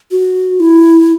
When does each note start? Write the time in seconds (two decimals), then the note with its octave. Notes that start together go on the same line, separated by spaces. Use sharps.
0.11 F#4
0.60 E4